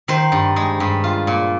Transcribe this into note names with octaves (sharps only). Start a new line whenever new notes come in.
D#3 C5
G2
G#3
G2
F4
A#2